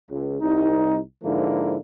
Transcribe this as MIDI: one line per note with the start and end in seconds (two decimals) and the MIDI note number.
0.10 0.38 37
0.41 0.99 36
0.41 0.99 63
1.23 1.77 44
1.23 1.77 50
1.23 1.77 53
1.23 1.77 58
1.23 1.77 64